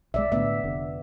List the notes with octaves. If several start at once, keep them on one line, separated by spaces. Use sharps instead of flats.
B1 G#3 D5 E5
A2 D3 B3 E5
F1 D3